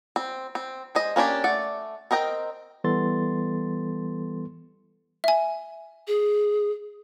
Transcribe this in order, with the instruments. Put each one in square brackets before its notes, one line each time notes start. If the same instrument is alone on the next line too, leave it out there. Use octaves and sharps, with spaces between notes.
[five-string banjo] C4
C4
G#3 C5 D#5
A#3 C#4 D4 G4
A3 D5 F#5
C4 A#4 D#5 G5
[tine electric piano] E3 G3 B3 A4 C6 A6
[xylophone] E5 G#5
[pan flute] G#4